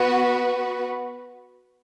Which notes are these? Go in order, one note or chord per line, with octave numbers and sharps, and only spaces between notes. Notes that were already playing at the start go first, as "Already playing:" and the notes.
Already playing: B3 F#4 B4